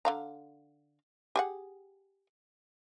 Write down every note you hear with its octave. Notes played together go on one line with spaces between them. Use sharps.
D3 F5 A#5
G4 G#4 F#5